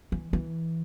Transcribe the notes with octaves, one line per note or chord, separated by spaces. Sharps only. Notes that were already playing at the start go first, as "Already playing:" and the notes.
E3
E3